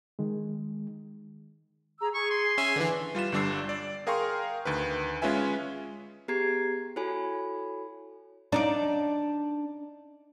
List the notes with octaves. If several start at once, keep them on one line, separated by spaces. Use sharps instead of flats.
D#3 G#3
G#4 A#5 E6
G#4 C#6
C6
C#4 E5 G#5
D3 E3 B4 G#5 D6
G3 F4 B4 E7
G1 D3 G3 D4 E6 C7
D5
G#4 A#4 F5 G5 C6 C#6
D2 D#3 B4
G#3 C#4 F4 B4 E5 G#5
B3 G4 G#4 A#5 G#6 C7
E4 F#4 A4 C#5 G#5 B5
D4 D#4 D5